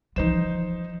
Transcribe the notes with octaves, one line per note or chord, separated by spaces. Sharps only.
E3 F3 D#4 C5 E7